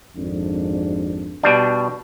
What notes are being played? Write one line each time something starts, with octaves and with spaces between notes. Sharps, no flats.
G#1 F2 D4
B2 G3 D4